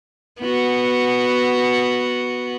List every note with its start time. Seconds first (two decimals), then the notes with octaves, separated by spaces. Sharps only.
0.40 B3 F#4